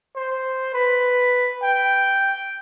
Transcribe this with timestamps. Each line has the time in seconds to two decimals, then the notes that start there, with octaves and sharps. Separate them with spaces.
0.16 C5
0.74 B4
1.63 G5